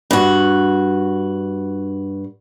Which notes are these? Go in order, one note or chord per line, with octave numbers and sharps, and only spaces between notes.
G2 F#4